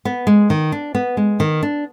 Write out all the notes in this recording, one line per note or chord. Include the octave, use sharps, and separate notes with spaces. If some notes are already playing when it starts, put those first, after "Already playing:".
B3
G#3
D#3
D4
B3
G#3
D#3
D4